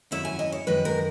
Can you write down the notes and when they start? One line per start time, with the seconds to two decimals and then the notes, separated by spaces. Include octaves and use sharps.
0.11 F#2 D#3 F#3 C#4 E4 E5
0.25 G#5
0.39 D#5
0.52 C#5
0.67 F#2 D#3 G#3 B4
0.85 A#4